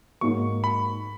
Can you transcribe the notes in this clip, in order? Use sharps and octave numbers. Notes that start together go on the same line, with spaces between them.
G#2 F#3 A#3 D#4 F#4 C#6
B5